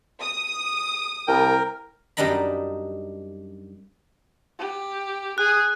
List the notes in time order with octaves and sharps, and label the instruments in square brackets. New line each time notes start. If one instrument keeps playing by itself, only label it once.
[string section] D#6
[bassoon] C2 [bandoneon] A#4 [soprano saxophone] G5
[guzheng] F#2 G3 D4 D#4 A#5 B5
[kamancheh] G4
[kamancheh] G#4 [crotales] F#6